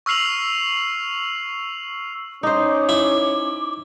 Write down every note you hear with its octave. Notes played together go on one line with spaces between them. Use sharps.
C#6 E6 F6 C7 F7 F#7
C#4 D#4 C5 D6
E4